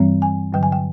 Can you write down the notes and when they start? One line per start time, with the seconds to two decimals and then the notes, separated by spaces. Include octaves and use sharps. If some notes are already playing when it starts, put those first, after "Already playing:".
Already playing: G2 E3 G3 C4
0.22 G#5
0.53 G2 D3 F#3 G5
0.63 G#5
0.72 G5